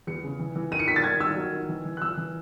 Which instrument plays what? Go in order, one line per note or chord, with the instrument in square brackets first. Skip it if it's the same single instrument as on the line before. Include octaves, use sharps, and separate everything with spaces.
[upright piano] E2 C#7
C#3
E3
E3
D#3 D#7
C#7
D#3 B6
A6
D#3 G#6
D#3 E6
F#3
D#3
E3
E3
F#6
E3 E6
E3